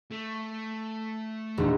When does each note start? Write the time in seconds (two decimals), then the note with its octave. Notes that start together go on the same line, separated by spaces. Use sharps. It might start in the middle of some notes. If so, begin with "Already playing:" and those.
0.11 A3
1.58 E1 A#1 D#4